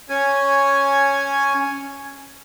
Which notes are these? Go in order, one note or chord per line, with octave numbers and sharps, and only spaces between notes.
C#4 G#5